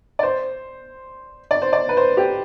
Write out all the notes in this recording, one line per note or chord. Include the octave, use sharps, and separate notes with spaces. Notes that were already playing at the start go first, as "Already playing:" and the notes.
D5
C5
D5
C5
D5
B4
C5
G4